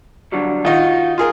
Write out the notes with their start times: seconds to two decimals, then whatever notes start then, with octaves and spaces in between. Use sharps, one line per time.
0.32 D3 F#3 G3
0.65 D#3 D#4 F4 F#4
1.18 F4 G#4 A#4